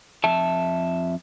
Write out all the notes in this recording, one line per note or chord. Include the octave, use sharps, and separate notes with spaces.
F2 E5 A5